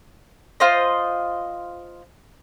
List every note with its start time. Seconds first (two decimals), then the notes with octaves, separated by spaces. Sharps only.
0.60 F4 C5 D#5